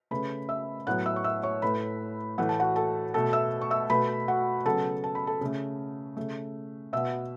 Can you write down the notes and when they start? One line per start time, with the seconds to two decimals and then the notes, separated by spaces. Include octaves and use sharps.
0.11 C#3 A3 B4 B5
0.49 E5 E6
0.87 A2 F#3 B3 F#5 F#6
1.06 E5 E6
1.16 C#6
1.24 E5 E6
1.43 C#5 C#6
1.62 A2 A3 B4 B5
2.38 A2 E3 A3 F#5
2.49 A5
2.60 F#4 F#5
2.76 A4 A5
3.14 B2 A3 A4 A5
3.33 E5 E6
3.61 C#6
3.71 E5 E6
3.90 B2 A3 B4 B5
4.28 F#4 F#5
4.65 C#3 F#3 B3 A4 A5
5.04 A5
5.15 B5
5.27 A4 A5
5.41 C#3 A3
6.17 C#3 A3
6.93 B2 B3 E5 E6